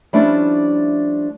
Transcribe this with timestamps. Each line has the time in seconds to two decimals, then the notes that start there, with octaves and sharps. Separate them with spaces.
0.13 F3 G3 A3 C#4 D4 E4